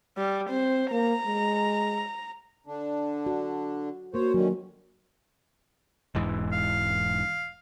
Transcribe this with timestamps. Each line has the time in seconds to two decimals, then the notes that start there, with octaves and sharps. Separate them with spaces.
0.18 G3
0.50 C4 C5
0.92 A#3 A#5
1.26 G#3
2.67 D3 D4
3.26 F#4
4.14 A#3 F#4 A#4 C5 C#5
4.34 D3 D#3 F#3 C#4
6.15 E1 G#2 E3
6.52 F5